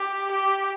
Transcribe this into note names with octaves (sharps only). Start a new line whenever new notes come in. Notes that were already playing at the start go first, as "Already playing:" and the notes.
Already playing: G4
G4